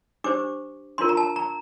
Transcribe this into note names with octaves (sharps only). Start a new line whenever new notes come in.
D4 G4 C5 D6
D4 F4 A#4 C6
A#5
A5
A#5